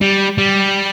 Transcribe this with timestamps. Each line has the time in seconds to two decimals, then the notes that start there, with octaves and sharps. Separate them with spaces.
0.01 G3
0.38 G3